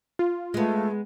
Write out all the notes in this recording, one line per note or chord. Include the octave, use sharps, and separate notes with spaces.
F4
G#3 A3 B3